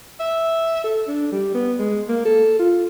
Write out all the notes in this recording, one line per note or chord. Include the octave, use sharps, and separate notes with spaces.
E5
A4
D4
G3
B3
G#3
A#3
A4
F4